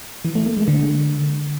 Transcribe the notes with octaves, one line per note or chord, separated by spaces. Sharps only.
E3
A3
A#3
G#3
D3